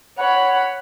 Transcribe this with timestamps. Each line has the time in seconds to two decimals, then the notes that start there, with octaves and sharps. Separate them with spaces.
0.18 C#5 F#5 B5